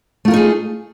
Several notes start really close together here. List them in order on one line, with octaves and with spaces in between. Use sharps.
A3 F4 A#4 D#4 G#4